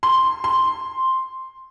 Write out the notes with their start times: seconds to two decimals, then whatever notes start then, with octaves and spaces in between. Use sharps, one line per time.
0.03 C6
0.44 C6